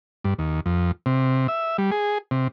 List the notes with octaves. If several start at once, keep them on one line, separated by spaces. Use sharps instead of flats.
G2
D#2
F2
C3
E5
G3
G#4
C3